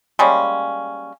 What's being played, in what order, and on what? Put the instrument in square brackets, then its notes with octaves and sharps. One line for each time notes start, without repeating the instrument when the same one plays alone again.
[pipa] G3 G#3 A#3 C#4